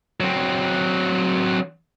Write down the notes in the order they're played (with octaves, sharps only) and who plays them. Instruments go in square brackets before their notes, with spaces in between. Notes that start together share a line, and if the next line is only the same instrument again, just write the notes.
[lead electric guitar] F#3 C4